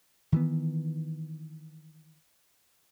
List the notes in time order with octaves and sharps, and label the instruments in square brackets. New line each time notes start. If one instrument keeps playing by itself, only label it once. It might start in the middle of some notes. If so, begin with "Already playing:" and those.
[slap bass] D#3 E3 B3